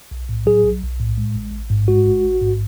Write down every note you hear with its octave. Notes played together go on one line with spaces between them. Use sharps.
B1
A2
F#3 G#4
B1
B1
A2
G#3
A1
A1
G#2
G#3 F#4
A1
A1
G#2